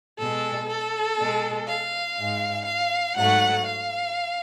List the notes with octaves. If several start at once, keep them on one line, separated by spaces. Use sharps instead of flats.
B2 G#3 A4
A4
B2 G#3
F5
G#2 G#3
F5
G#2 F#3 A3 F#5
F5